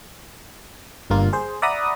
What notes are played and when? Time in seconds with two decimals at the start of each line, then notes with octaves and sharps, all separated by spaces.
1.10 G1 G2 A#3 F4
1.33 G#4 C5
1.62 D5 E5 F#5 A#5 B5 D#6